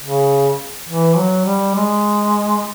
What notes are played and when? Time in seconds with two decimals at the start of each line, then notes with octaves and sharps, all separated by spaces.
0.03 C#3
0.89 E3
1.17 F#3
1.46 G3
1.75 G#3